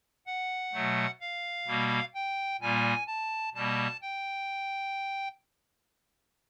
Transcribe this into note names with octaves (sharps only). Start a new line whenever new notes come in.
F#5
B2 F#3 A3
F5
B2 G3 A#3
G5
A#2 G3 A#3 G#5
A5
B2 G3 A#3 A5
G5